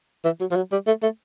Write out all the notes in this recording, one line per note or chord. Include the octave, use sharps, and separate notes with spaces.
E3
F#3
F3
F#3
G3
A3
A3